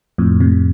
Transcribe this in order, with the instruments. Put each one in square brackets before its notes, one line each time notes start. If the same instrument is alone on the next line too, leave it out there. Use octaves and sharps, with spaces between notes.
[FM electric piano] F2 A2
A2 C3